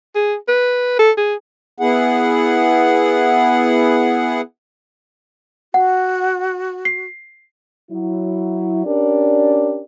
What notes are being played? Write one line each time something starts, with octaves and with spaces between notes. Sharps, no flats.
G#4
B4
A4
G#4
B3 E4 G#4 F#5
F#4 F#5
C7
F#3 E4
C#4 D4 G4 A#4 D5